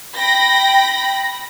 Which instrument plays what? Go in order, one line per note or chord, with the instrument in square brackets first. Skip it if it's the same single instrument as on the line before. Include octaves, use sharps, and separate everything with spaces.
[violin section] G5 B5 A#6